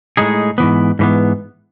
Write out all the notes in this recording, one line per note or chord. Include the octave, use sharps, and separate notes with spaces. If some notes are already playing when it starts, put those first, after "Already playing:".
A2 G#3 D#4 G#4
G#2 E3 B3
G#2 E3 B3